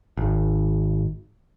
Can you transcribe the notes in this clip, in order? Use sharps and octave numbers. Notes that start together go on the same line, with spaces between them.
G#1